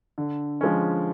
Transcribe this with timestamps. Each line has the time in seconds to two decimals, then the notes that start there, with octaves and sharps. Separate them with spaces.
0.18 D3
0.61 F3 G#3 C#4